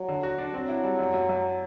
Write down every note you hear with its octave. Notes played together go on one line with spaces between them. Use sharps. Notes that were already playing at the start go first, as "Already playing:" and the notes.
Already playing: F#3
D3
F#4
D4
F#3 C4
E4
G3
F#2
F#2
F#2